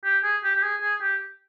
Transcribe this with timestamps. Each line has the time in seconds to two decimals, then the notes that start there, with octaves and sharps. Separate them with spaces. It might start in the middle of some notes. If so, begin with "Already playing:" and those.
0.04 G4
0.24 G#4
0.44 G4
0.56 G4
0.63 G#4
0.82 G#4
1.01 G4